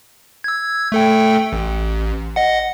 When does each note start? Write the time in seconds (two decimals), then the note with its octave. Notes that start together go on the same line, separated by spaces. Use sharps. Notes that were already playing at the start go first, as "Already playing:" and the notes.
0.44 E6 G#6
0.92 A3 A4 G5
1.53 A1
2.36 D#5 F#5